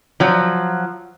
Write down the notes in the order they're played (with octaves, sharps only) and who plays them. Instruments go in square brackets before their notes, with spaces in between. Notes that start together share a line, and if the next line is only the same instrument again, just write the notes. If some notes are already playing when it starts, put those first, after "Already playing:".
[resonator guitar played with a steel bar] F3 F#3